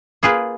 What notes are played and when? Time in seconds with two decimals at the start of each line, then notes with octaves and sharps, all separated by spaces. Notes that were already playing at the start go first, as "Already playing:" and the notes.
0.23 A#3 F4 G#4 B4